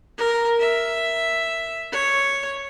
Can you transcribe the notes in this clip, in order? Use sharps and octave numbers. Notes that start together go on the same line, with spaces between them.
A#4
E5
C#5